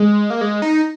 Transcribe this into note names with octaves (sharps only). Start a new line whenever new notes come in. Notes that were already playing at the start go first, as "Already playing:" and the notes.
Already playing: G#3
A#3
G#3
D#4